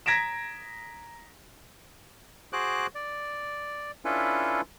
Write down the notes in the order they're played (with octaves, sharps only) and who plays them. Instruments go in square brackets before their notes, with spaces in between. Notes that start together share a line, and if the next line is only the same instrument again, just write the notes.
[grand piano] A#5 G#6 A#6 B6 D7 E7
[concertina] F#4 G#4 C5 D6 F#6
D5
C#4 D4 E4 F4 A4 B4